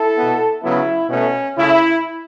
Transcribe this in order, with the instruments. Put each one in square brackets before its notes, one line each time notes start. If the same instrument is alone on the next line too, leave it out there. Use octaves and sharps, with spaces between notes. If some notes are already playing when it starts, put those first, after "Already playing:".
Already playing: [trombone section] E4 A4
B2 B3
C#3 F#3 B3 E4
B2 A3 C#4
C#3 A3 E4